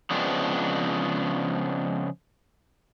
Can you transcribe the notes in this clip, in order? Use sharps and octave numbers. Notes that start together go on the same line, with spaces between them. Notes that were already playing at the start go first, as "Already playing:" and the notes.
C#3 F3 G#3 B3 C4 D4